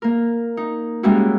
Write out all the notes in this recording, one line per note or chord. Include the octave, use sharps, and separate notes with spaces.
A#3 A#4
D#4
G3 G#3 A#3 C#4 E4 F#4